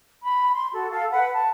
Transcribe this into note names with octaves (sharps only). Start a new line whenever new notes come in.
B5
C6
F#4 A4
A4 F5
B4 F#5
A5